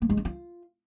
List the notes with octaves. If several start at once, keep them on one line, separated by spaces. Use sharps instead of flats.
A#3
G#3
D4
F4